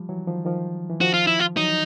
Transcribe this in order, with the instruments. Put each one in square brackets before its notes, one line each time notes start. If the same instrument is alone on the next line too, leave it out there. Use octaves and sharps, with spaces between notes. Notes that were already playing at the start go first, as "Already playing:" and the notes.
Already playing: [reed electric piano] F3 G3
E3 F#3
D#3 F3
D#3 F3
E3
[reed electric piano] D#3 F3 [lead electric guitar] F#4
[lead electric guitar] F4
E4
F4
[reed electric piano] E3 F#3 [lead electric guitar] D#4